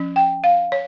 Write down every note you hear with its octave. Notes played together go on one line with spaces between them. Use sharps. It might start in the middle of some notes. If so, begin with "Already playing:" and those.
Already playing: F3 C#4
G5
F5
C#5